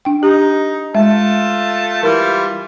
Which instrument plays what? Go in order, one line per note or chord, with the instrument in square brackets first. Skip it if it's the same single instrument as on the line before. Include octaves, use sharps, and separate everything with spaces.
[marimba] D4 G5
[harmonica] D#4 [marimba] G4
[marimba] G#3 E5 [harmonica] A3 F4 A5
[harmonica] E3 G3 F4 [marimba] A#4